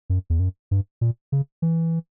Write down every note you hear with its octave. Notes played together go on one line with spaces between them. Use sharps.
F#2
E2
F#2
G2
A#2
C#3
E3